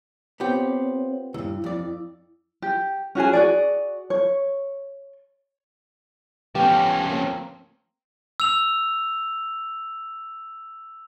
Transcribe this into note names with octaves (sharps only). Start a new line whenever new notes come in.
B3 C4 F4 G4 C5 C#5
C#2 G2 E4
F2 D5
G4
C#4 F#4 G#4 G#5
F#4 G#4 D5
C#5
F3 A3 B3 C#4 G4
A#3 C4
E6 F7